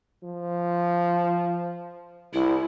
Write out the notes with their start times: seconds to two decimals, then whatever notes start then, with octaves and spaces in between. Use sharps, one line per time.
0.23 F3
2.33 C2 E4